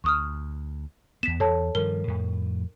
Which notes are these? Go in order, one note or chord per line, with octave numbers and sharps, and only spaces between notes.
D2 C#6 D#6 F6
E2 B3 B6 E7
E2 A4 C#5 A5
G2 D#3 F3 A#4 G7
F2 A2